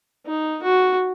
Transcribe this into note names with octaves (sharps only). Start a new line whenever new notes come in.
D#4
F#4